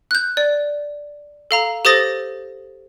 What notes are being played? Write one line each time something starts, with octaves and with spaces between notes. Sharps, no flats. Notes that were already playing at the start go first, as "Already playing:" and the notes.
F#6 G6
D5
A4 F5 A#5
G4 A4 C5 D#6 A6 A#6